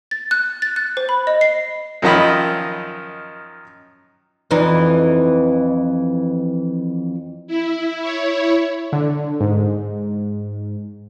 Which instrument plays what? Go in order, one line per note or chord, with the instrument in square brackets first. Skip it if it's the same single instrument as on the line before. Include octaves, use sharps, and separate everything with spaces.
[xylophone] A6
F#6
A6
F#6
C5
B5
D#5
C7
[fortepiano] F#2 D#3 F3 D#5 B5
[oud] F2 E3 D#4
[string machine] E4
E4 C#5
[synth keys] D3
G#2